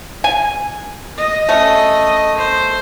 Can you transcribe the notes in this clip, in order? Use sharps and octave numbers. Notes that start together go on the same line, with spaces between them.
G#5
D#5
A3 C#4
C5